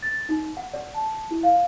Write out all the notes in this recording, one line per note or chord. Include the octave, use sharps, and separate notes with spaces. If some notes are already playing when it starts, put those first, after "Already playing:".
A6
D#4
F#5
D5
A5
E4
F5